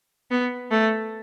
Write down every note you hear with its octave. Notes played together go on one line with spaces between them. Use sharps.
B3
A3